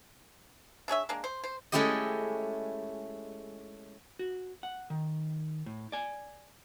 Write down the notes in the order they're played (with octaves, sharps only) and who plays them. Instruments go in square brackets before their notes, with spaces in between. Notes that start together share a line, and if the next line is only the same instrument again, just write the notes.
[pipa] D4 G#4 C#5 E5
G#3 A#3 D4
C5
C5
[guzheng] G#3 A3 C#4 E4 G4 D#5
[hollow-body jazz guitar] F#4
F#5
D#3
A2
D5 G#5